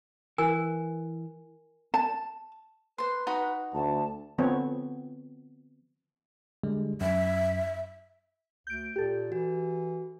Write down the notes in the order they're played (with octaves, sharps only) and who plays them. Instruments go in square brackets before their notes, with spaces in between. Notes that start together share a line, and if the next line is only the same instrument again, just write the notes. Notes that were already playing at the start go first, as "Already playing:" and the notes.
[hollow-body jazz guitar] E3 [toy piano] A#4 G#5
[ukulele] A5
[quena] B4 [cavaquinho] C5 C6
[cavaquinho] D#4 F#4 B5
[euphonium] D2 [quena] A5
[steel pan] D3 F3 B3 C4 C#5
[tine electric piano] D3 G3 G#3
[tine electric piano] F#2 [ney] E5
[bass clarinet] D2 [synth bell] G6 D7
[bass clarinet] A#2 [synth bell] G4 A4
[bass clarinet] E3 [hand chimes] F#4